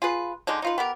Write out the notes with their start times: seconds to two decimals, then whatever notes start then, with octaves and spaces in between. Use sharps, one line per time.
0.02 F4 G#4 B4
0.47 D3 G#3 D4 D#4
0.62 D#4 F4 B4
0.78 B3 G4 A#4